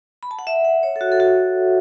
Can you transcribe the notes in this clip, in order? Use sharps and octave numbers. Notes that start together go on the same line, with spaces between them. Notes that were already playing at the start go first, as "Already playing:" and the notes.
B5
A5
F#5
E5
F#5
C#5
A4
F#4
A4
F#4